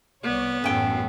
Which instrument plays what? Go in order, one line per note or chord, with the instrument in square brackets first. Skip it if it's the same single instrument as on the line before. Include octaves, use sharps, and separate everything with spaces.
[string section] C2 C#5 D5 [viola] B3
[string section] A1 F#2 A4 [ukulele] C#4 G5